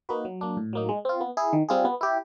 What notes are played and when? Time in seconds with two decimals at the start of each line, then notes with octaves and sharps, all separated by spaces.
0.09 A#3 D#4 F#4 B4
0.25 F#3
0.41 A#3 D4
0.57 A2
0.73 F#3 A#3 D#4
0.89 G#3
1.05 C4 F4
1.21 B3
1.37 E4 G#4
1.53 D#3
1.69 G3 C4 F4 G#4
1.85 B3
2.01 E4 G4